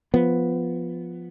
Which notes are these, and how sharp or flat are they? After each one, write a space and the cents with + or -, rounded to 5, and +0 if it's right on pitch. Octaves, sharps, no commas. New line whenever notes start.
F3 +0 B3 +0